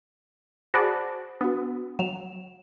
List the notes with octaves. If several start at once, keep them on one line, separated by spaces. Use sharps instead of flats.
F#4 G#4 C5 D5 A5 B5
B3 D4 F#4
F#3 E7 F7